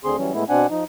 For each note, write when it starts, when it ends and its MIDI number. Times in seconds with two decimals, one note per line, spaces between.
0.05 0.16 38
0.05 0.16 50
0.05 0.16 60
0.05 0.16 68
0.05 0.16 84
0.17 0.33 52
0.17 0.33 54
0.17 0.33 55
0.17 0.33 61
0.33 0.44 45
0.33 0.44 56
0.33 0.44 57
0.33 0.44 59
0.33 0.44 64
0.49 0.67 47
0.49 0.67 60
0.49 0.67 62
0.49 0.67 78
0.49 0.67 80
0.70 0.84 53
0.70 0.84 63